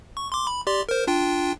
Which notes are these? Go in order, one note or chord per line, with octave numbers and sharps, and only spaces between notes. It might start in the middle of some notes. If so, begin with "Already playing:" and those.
C#6
C6 D6
B5
G4 D5 C6
A#4 C5
D4 F4 G5